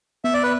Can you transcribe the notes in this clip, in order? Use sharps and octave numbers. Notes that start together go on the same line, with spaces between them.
B3 E5
D5
B4